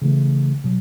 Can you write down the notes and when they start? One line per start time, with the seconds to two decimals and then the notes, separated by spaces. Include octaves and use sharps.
0.02 C#3 E3 A3
0.64 B2 F#3